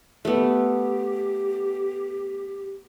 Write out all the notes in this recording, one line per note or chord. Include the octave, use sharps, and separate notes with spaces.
A3 B3 G4